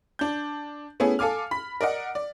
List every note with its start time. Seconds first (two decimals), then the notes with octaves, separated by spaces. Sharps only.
0.19 D4 G6
1.00 A3 B3 C#4 E4 G#4
1.19 A4 F5 G#5 D6 F6
1.51 B5 B6
1.81 A#4 D5 D#5 F#5
2.15 D5